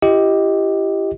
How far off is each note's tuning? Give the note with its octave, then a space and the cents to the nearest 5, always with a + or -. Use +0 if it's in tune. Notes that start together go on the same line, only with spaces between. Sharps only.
E4 +40 G4 +0 D#5 +10